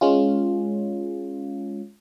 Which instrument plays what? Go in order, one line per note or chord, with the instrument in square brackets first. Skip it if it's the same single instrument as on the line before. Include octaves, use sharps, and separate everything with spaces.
[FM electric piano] G#3 C#4 F4